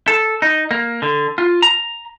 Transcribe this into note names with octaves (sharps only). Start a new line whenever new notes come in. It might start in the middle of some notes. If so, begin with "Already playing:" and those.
A4
D#4
A#3
D3
F4
A#5